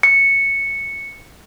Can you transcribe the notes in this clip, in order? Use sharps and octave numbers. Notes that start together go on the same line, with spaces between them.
C#7